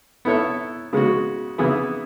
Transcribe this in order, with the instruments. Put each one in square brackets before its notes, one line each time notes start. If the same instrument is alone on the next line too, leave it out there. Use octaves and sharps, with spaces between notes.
[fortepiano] B3 E4 A4 C#5 E5
C#3 G#3 B3 F#4
C#3 E3 B3 E4 G#4